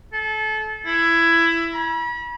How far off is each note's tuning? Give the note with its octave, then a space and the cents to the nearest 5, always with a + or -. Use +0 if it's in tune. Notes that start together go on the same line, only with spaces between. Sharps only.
A4 -30
E4 +15
B5 -40